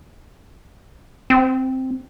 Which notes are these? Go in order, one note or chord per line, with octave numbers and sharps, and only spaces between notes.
C4